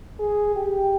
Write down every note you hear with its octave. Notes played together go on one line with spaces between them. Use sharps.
G#4
G4